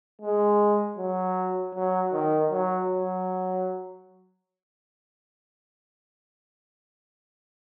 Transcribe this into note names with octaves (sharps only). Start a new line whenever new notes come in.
G#3
F#3
F#3
D#3
F#3
F#3